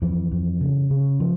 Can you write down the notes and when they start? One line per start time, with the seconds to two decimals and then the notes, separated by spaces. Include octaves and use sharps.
0.02 F2 E3
0.31 F2
0.61 C#3
0.90 C#3
1.20 F3